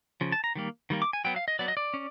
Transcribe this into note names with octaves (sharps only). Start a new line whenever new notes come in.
C#3 F3
A5
A#5
D#3 G3 A#3
D#3 G3 A#3
D6
G#5
F#3 B3 G5
F5
D#5
F#3 B3 D5
D#5
D5
C#4